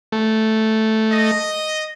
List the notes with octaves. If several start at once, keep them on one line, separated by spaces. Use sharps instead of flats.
A3
D#5